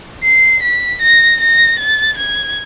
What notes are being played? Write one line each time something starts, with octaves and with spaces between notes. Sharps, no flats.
C7
B6
A#6
A#6
A6
G#6